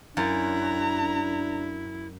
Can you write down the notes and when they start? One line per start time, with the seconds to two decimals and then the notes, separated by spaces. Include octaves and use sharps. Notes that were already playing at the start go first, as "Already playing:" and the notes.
0.17 F#2 D4 E4 A#5